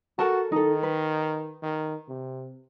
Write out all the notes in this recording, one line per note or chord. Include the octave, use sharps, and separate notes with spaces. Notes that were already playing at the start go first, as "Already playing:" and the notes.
F#4 A4 A#4 A5
D#3 D#4 A4
B4
D#3
C3